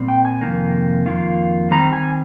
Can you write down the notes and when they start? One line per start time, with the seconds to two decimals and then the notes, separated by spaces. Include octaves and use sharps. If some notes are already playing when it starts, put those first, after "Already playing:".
Already playing: A#2 G3 C4
0.08 G5
0.25 G#5
0.41 F2 C3 D#3 A#3
1.06 F2 D#3 A#3 F4
1.71 D#3 G3 C4 A#5
1.93 G#5